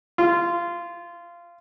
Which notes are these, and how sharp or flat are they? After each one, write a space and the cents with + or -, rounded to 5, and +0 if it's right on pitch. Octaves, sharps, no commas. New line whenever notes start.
F4 -20